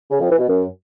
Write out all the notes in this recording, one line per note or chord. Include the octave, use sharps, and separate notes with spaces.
C#3
F2
E3
B2
F#2